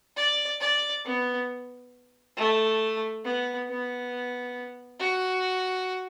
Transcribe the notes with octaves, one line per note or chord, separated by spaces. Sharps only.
D5
D5
B3
A3
B3
B3
F#4